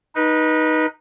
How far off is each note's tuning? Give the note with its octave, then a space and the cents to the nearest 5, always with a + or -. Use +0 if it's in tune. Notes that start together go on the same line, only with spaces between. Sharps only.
D#4 +0 B4 -25